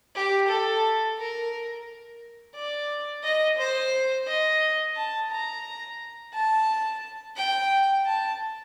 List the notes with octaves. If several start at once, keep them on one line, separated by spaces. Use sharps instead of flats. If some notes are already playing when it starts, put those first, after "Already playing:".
G4
A4
A#4
D5
D#5
C5
D#5
A5
A#5
A5
G5
A5